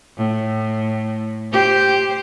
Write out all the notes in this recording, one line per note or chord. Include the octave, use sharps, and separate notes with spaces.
A2
G4 C5